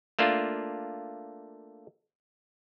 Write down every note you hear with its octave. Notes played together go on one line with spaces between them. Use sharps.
A3 A#3 D4 F4